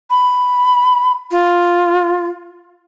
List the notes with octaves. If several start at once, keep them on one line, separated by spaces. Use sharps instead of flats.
B5
F4